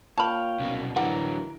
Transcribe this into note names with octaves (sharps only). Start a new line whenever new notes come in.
A#2 C#5 F5 G5 A5 B5
C2 F#2 B2
D3 E3 F#3 G3 A#4 F#5